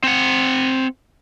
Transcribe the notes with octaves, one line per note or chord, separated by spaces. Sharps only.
C4 F#5